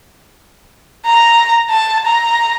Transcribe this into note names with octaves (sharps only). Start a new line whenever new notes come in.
A#5
A5
A#5